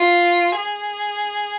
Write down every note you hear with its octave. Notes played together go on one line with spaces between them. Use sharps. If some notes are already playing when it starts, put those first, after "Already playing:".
Already playing: F4
G#4